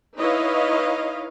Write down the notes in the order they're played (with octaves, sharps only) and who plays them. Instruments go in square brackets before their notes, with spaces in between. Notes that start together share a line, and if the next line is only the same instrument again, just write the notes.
[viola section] D#4 E4 B4 C#5 D#5 F5